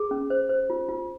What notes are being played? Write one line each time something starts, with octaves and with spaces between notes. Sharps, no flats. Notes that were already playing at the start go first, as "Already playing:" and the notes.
Already playing: G#4
C#4
C5
C5
F4
F4